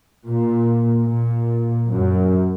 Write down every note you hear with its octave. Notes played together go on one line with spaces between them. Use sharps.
A#2
A#2
F#2